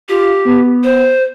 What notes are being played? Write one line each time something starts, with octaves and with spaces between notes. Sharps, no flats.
F4 G4
B3
C5